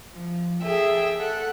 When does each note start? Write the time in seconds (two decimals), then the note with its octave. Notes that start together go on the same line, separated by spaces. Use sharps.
0.14 F3
0.62 G#4 A4 E5 G5
1.16 A4 F#5